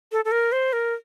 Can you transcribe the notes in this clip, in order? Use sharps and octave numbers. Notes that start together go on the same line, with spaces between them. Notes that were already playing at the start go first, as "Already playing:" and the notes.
A4
A4
A#4
C5
A#4